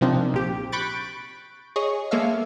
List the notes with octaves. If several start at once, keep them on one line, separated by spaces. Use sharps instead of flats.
C3 F3 A#3 C4 D4 D#4
A#1 G4
B5 C#6 F#6 G6 A6 D7
G#4 C#5 D#5 C#6
G#3 A#3 B3 A4 E5 F5